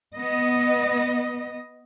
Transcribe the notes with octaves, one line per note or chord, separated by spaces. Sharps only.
B3 D#5